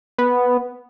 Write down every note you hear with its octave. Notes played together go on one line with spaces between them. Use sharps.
B3